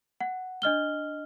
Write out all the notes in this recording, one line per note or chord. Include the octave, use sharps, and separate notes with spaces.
F#5
D4 D#5 F6 G7